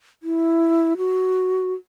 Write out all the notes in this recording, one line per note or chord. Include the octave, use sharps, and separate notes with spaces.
E4
F#4